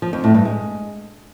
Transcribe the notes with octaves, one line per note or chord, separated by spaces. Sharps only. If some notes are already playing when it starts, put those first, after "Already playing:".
F3
F2
A2
G2
G#3